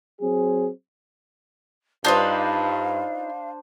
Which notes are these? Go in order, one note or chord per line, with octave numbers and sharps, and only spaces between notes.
F#3 C4 G#4
G2 D4 D#4 F4 B4 C5 F5 C6